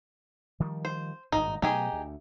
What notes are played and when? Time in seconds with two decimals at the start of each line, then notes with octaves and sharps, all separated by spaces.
0.60 D#3 F3 G3
0.85 C5
1.32 G#1 G2 A#2 D#4
1.62 B2 F#3 A3 D#4 G4 G#4
1.93 D2